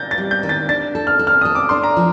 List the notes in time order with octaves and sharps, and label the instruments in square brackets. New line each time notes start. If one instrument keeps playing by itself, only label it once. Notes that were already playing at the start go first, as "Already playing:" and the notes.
Already playing: [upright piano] G6 A6 A#6
A6
[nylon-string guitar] G3
[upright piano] G6
[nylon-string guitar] D#3
[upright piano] A6
[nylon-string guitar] D4 [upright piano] A6
[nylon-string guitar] A4
[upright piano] F6
[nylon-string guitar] A4
[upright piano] F6
[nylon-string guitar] A4 [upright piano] D#6
[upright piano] D6
[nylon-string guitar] D4 [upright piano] C6
[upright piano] A#5
[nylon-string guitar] F3